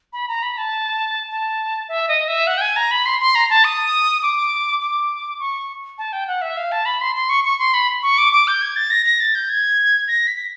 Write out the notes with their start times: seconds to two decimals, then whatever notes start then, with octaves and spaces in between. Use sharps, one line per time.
0.13 B5
0.28 A#5
0.42 B5
0.57 A5
1.31 A5
1.89 E5
2.08 D#5
2.28 E5
2.47 F#5
2.58 G5
2.61 G#5
2.76 A#5
2.91 B5
3.06 C6
3.21 C6
3.35 A#5
3.50 A5
3.64 D#6
4.23 D6
4.81 D6
5.40 C#6
5.98 A5
6.13 G5
6.28 F#5
6.42 E5
6.57 F5
6.72 A5
6.86 B5
7.01 C6
7.15 C6
7.30 C#6
7.45 C#6
7.59 C6
7.74 B5
8.03 C#6
8.18 D6
8.33 D6
8.47 G6
8.62 G#6
8.76 A6
8.91 A#6
9.06 A#6
9.20 A6
9.35 G6
9.49 G#6
10.08 A#6
10.27 B6